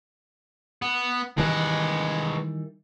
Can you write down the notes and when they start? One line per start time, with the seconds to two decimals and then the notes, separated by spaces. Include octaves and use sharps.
0.82 B3
1.38 D#3 E3 G3 G#3 B4